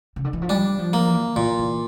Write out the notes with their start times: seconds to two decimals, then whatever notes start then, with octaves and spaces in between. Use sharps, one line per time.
0.16 C#3
0.24 D3
0.33 E3
0.42 F3
0.49 G3 D4
0.79 F3
0.93 A#3
1.08 E3
1.36 A#2 E3
1.59 E3